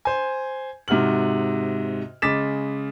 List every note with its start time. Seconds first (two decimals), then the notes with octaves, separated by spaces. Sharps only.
0.05 C5 G#5
0.88 G#2 C3 F#4 F6 F#7
2.22 C#3 G#3 D6 A6 B6 E7